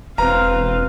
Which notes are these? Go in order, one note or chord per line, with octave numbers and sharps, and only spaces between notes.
E1 C4 B4 F5 A#5